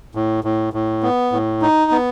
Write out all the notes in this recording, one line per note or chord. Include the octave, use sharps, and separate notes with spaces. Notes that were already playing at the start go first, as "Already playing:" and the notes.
A2
A2
A2
B3
A2
D#4
B3